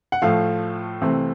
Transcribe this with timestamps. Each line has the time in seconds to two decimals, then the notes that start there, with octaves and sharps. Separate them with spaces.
0.12 F#5
0.22 A2 F3 A3 F5
1.01 C2 C3 E3 A3 C4